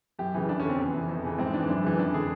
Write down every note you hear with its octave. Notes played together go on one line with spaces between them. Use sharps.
F#2 G4
C#3 E3
F2 D4
C#4
D3 C4
E2 B3
C3 E3
F2
C#3 E3
G#2 C4
E3 D4
F#2 D4
C#3 E3
F2 D4
D3 G#4